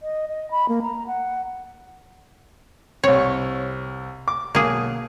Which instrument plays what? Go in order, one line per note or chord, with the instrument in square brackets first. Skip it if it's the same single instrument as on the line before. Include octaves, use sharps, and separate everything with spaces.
[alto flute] D#5
D#5
B5
A#3
A#5
F#5
[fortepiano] C2 C4 [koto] C#5
[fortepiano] D6
[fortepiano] B1 [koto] A#3 G#4